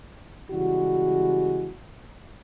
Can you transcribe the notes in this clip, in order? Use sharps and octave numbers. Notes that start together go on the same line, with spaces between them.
C#3 E3 G3 G#3 F#4